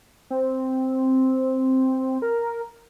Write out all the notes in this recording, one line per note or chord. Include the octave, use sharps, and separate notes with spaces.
C4
A#4